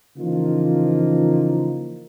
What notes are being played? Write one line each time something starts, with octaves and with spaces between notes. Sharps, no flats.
C#3 E3 F3 A#3 D#4 F4